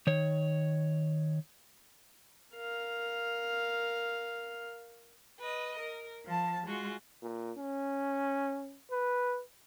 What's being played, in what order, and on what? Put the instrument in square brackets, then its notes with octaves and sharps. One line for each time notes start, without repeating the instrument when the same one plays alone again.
[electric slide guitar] D#3 C#5
[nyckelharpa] A#4 F5
[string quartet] B4 D#5
A#4
F3 A5
G#3 F4 F#4
[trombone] A#2
C#4
B4